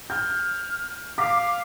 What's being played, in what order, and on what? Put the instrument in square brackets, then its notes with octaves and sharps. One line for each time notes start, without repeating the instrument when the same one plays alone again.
[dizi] F6 [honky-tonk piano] G6
[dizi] F5 [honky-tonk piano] D6 B6